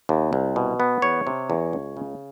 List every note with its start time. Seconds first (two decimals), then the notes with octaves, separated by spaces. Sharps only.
0.09 D#2
0.33 C2
0.56 B2
0.80 B3
1.02 E2 C#5
1.27 C3
1.50 E2
1.73 C#2
1.97 C#3